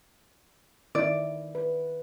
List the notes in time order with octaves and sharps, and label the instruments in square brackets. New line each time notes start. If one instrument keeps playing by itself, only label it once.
[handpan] D#3 E4 [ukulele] D5
[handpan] B4